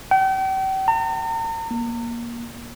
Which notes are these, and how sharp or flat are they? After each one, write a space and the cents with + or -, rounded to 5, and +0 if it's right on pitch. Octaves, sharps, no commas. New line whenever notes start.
G5 -40
A#5 -45
A#3 +20